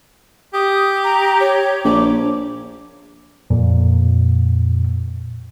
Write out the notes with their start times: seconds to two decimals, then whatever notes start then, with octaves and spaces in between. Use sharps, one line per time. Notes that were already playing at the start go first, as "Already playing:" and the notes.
0.54 G4 D#6
1.04 A#5
1.41 C#5
1.84 A#1 D6
3.50 F2 A#2